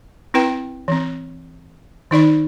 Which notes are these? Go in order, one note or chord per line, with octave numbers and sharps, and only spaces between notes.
C4 E4 B4 G5
E3 C4
D#3 D#4 D5 B5